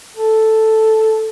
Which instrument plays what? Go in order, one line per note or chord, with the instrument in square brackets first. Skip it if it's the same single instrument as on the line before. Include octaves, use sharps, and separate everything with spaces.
[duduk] A4